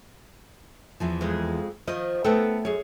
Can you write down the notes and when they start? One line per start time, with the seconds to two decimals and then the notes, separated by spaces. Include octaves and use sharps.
1.00 E2 E3 F3
1.21 F2 G#3
1.87 D#3 F3 D#5
2.24 A3 B3 D#4 A4 G5
2.65 F#2 G#4 C#5